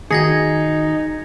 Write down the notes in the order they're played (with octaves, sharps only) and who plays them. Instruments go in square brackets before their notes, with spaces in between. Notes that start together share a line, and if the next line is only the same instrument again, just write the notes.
[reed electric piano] D#3 F#4 [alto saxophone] D#4 [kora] G#4 [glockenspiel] G#6 A#6 C#7